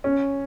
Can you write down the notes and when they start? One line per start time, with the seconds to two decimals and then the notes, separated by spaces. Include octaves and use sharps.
0.04 C#4